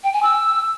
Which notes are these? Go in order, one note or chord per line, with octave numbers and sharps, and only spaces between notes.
G5
G#5
E6